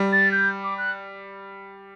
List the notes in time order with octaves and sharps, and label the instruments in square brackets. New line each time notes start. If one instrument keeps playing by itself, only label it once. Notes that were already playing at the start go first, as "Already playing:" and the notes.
Already playing: [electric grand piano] G3
[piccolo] A6
G6
D6
F#6